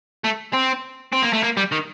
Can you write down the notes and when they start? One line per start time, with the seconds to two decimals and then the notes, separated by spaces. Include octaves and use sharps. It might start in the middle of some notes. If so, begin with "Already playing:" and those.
0.24 A3
0.53 C4
1.13 C4
1.23 A#3
1.33 A3
1.43 A#3
1.57 G3
1.72 D#3